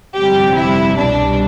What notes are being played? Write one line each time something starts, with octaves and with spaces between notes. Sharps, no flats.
G1 F2 C3 G3 G4
E4
C2 B2 G3 D4